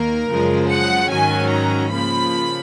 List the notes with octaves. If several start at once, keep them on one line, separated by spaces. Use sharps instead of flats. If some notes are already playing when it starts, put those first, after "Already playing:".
Already playing: D#2 D#3 A#3 A#4
F#2 C#3 F3 G#3
F#5
G#2 D#3 F#3 C#4 G#5
A#5
C#3 F3 A#3 B5